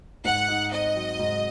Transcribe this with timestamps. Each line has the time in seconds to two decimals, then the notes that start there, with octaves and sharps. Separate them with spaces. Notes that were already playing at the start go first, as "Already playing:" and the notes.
0.24 G#2 F#5
0.48 D#4
0.72 C4 D#5
0.95 F#3
1.19 G#2